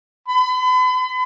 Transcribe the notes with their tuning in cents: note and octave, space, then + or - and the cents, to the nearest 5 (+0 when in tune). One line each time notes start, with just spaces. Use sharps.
B5 +40